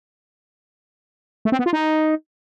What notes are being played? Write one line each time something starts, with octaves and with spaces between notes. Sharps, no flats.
A3
C4
B3
F4
D#4